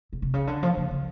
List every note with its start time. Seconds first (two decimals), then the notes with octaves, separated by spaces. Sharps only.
0.13 B2
0.22 C3
0.34 C#3
0.47 D3
0.63 F3
0.77 C#3
0.91 C#3